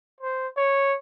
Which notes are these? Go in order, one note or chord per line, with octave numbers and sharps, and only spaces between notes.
C5
C#5